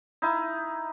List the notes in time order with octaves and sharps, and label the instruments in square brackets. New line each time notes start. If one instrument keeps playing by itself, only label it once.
[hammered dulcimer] D#4 E4